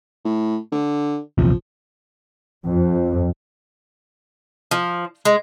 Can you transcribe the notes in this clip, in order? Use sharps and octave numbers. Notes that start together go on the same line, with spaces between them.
A2
D3
A#1 E2 C3 F3
F2
F3
G#3